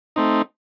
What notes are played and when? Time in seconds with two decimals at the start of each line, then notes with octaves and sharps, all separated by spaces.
0.16 A3 C4 D#4